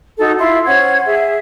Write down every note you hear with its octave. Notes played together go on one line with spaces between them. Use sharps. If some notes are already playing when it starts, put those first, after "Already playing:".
D#4 F#4 A4
E4 F4 C6
C#4 C5 F#5 G#6
G#4 E5